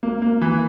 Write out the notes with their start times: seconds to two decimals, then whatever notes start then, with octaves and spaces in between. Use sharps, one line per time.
0.03 A#3
0.22 A#3
0.41 E3